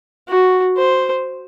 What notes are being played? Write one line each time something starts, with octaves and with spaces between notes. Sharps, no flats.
F#4
C5